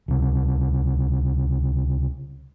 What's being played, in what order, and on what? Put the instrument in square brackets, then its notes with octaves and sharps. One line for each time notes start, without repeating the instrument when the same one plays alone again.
[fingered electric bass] C#2 C3